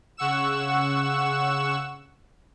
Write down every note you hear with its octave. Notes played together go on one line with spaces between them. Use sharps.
C#3 F#5 C#6 E6 E7